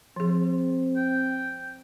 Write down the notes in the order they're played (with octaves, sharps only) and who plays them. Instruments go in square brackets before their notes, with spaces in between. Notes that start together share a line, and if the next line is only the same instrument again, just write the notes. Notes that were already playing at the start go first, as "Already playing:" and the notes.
[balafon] F3 G#4 [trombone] C4
[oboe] G5